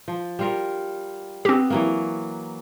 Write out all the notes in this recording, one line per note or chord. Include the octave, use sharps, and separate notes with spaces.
F3
G3 F4 A#4
B3 C4 G4
E3 F#3 A#3